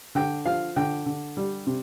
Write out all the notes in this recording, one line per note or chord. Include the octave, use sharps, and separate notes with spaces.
D3 G5
F3 F5
D3 G5
D3
G3
C3